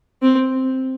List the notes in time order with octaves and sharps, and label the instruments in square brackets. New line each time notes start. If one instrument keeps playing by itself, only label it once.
[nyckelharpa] C4